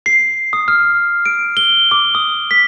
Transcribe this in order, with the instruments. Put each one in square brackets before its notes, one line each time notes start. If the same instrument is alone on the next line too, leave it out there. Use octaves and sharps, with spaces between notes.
[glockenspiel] C7
D#6
F6
D7
G7
D6
D#6
B6